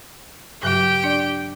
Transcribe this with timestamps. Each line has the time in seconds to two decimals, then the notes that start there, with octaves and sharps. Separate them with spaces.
0.63 G2 C#3 F#3 G4 G5
1.04 D4 D5